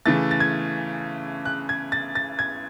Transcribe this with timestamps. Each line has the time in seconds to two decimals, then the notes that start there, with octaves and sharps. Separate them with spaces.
0.06 C#3 E3 A3 A6
0.31 A6
0.40 G#6
1.45 F#6
1.69 G#6
1.92 A6
2.15 A6
2.39 G#6